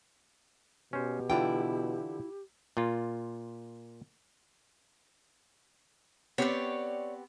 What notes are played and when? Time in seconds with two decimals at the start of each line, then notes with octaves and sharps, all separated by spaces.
0.93 B2 C#4 G4 C5
1.30 D3 E3 E4 F4 G5
2.77 A#2 F4
6.38 B3 C4 G4 C#5 D5